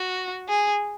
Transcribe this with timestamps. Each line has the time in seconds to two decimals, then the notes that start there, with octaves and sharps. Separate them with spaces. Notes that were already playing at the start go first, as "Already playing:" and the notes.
Already playing: F#4
0.49 G#4